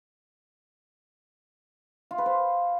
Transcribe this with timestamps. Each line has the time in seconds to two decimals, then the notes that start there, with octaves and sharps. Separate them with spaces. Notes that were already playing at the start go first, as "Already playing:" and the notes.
2.11 F4
2.18 B4
2.26 C5